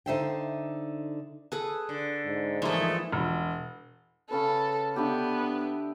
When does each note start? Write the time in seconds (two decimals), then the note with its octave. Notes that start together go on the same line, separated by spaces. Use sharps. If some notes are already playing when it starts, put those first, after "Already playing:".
0.06 D3 D#4 C5 E5 F5 G5
1.52 G#4 A4 B4
1.89 D3
2.26 G#2
2.62 E3 F3 A3 A#3 E4 G#4 C6
3.13 E1
4.31 C#3 C#4 A4 B4
4.96 D3 B3 E4 G4